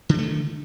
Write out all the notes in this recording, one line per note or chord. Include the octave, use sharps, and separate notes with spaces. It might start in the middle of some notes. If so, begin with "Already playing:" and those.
D3 D#3 G#3 A3